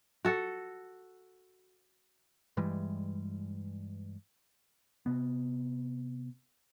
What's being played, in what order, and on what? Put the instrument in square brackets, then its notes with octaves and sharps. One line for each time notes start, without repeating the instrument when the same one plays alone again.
[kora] F#4 A4
[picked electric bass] G2 E3 G3 G#3
C3 B3